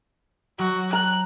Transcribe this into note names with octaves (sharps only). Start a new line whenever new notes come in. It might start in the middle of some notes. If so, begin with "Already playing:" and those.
F#3 F#4
A#5 F#6